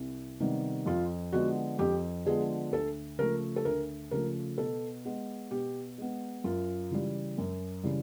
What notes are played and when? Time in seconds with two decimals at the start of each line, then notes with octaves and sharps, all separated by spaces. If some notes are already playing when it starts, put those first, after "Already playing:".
Already playing: C2
0.40 C3 D#3 G3 B3
0.86 F2 F4
1.33 D3 F3 G#3 B3 F#4
1.79 F2 G4
2.26 D3 F3 G#3 B3 G#4
2.72 D2 A4
3.18 C#3 F3 A3 A#4
3.56 A4
3.65 D2 A#4
4.11 C#3 F3 A3 A#4
4.58 B2 A4
5.05 G#3 B3
5.51 B2 G4
5.98 G#3 B3
6.44 F#2 F4
6.91 C#3 E3 G3
7.38 F#2
7.83 C#3 E3 G3